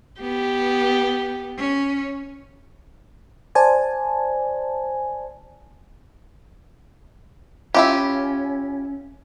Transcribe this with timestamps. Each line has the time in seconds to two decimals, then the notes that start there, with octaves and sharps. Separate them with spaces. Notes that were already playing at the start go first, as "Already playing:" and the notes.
0.21 B3 G4
1.58 C#4
3.55 C5 D5 G#5 A5
7.74 C#4 E4 F4 G4